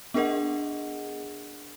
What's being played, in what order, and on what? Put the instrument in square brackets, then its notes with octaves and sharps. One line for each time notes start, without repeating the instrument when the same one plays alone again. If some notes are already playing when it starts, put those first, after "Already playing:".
[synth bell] B3 D4 G#4 A#4 D#5 F#5